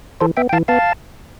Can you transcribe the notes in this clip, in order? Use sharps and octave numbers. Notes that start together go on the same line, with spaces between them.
E3 A4 C5
B3 E5 G5
G5
E3 F5 A5
B3 F5 A5